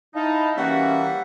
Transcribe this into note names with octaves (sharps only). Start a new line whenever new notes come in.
D#4 E4 F5 A5
E3 G3 A#3 C#4 F#4 E5 F#5